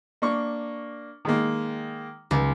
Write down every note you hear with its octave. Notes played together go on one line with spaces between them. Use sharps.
A#3 D4 C#6
D#3 G#3 A#3
C#2